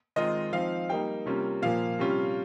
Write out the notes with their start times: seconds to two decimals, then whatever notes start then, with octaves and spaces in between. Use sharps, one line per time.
0.16 D#3 G#3 C4 F4 D#5
0.53 F3 C4 D#4 F5
0.89 G3 A#3 D#4 G5
1.26 C3 G3 A#3 C#4 F4
1.62 A#2 F3 A#3 F5
1.99 C3 G3 C#4 F4